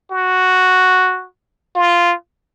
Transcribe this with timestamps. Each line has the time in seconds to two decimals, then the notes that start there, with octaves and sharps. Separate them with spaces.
0.11 F#4
1.75 F4